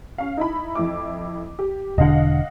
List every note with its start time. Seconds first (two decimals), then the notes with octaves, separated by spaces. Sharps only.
0.18 C#4 F5
0.37 D#4 E4 B5
0.75 F2 E4 D6
1.59 G4
1.98 E1 D3 D#5 F5 F#5